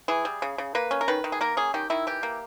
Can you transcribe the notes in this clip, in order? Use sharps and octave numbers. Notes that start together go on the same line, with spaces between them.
E3 G#4
G3
C#3
C#3
A#3 B4
C#4
A#4
D#3 B4
D#3
G#4
A#3 A#4
C#4 G#4
D#3 G4
D#3 E4
E3 G4
A#3